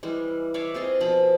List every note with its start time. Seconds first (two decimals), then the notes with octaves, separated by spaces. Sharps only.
0.03 E3 G3 G#3
0.54 C#5 D5 E5 F5
0.74 C4 F4 G#4 D#5
1.00 B2 F3 B5